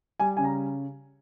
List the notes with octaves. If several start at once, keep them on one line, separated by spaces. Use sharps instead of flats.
G3 G#5
C#3 G#5
A#5